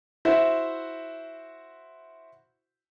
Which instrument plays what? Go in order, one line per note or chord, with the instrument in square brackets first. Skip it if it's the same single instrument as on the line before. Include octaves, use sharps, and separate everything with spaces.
[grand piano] E4 F#4 C5 E5